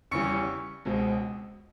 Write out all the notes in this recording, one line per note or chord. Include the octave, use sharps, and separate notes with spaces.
E2 C#3 E3 G3 C#6 C#7
C#2 B2 G#3 C4